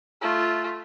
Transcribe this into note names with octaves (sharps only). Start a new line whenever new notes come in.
A3 F4